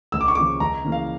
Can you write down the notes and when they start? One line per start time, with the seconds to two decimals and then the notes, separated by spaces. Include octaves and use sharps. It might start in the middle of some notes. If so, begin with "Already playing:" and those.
0.12 C#2 E6
0.21 D6
0.28 C#6
0.35 C#3 F3 A#3 D6
0.60 C#2 A#5
0.85 C#3 E3 A#3
0.92 F5